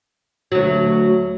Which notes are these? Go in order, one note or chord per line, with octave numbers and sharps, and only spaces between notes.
D2 F#3